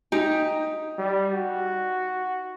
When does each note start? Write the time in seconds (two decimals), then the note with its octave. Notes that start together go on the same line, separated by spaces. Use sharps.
0.12 D#4 G4
0.98 G3
1.34 F#4